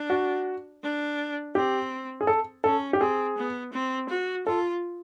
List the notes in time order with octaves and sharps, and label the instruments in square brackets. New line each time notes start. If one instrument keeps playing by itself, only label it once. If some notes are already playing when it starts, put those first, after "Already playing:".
Already playing: [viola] D4
[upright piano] F#4
[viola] D4
[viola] C4 [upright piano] G4
[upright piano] G#4
A4
[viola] C#4 [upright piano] A4
[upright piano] G4
[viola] C4 [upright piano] G#4
[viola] B3
C4
F#4
[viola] F4 [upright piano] A4